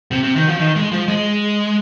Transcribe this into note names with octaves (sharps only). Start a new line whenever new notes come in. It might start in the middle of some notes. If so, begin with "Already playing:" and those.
C3
C3
D#3
F3
D#3
G#3
F3
G#3